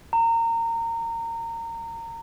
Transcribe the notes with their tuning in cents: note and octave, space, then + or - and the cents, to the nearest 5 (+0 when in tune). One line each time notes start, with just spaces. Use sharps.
A#5 -25